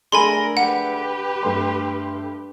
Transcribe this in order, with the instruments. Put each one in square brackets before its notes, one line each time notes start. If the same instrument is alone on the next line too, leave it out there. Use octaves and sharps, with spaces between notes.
[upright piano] A3 D4 G#4 [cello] A#4 [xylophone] G#5 B5 C6
[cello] G4 B4 [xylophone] F#5
[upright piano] G2 A3 C6